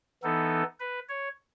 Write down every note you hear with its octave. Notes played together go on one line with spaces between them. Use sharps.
E3 B3 D#4 A4
B4
C#5